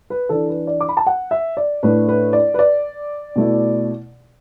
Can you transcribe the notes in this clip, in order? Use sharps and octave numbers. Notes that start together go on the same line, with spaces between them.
B4
E3 D4 A4
B4
D5
D6
B5
A5
F#5
E5
D5
A2 A3 D4 B4
B4
D5
B4
D5
B2 A3 E4